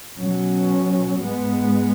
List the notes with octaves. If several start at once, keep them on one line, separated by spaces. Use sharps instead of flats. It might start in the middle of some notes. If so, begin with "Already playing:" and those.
B2 F#3 C#4
G#2 G#3 B3